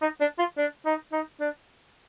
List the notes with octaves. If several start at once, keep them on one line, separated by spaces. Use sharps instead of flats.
D#4
D4
F4
D4
D#4
D#4
D4